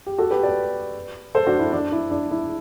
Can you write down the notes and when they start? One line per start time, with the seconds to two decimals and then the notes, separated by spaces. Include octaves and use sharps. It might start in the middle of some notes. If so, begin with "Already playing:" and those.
0.06 G4
0.18 F#4 A4
0.31 G4 B4
0.43 B4 D5
1.35 A4 C5
1.47 D4 F#4
1.59 E4
1.73 D4
1.92 E4
2.11 D4
2.31 E4